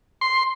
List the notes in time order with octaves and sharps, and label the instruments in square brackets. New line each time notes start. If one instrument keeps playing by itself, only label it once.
[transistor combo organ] C6